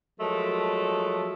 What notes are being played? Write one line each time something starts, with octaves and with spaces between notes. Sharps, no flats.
F3 F#3 G#3 A3 A#4